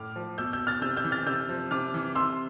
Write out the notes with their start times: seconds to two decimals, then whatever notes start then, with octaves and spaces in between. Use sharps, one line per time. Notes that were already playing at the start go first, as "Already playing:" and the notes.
Already playing: A2 D6 F6
0.16 F3
0.38 B2 E6 G6
0.53 E6 G6
0.67 F6 A6
0.82 C3 E6 G6
0.96 E6 G6
1.04 E3
1.12 F6 A6
1.26 C3 E6 G6
1.49 F3
1.71 C3 D6 F6
1.94 E3
2.15 C3 C6 E6